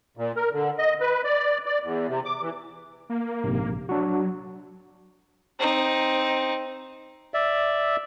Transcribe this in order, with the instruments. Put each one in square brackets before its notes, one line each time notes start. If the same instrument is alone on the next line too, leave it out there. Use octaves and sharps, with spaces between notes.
[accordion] A#2
A#4
D3
D#5
B4
D5
D5
E2
C3
D6
E3
[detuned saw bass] A#3
[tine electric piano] A#1 G#2 C3
[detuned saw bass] F#3 [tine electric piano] D4 F#4
[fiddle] C4 D#4
[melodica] D5 E5